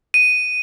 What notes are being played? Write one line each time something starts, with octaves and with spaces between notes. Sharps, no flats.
D#7